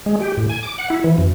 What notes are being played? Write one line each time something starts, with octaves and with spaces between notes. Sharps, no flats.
G#3
G4
A2
G#5
D6
F#5
E4
E3
F#2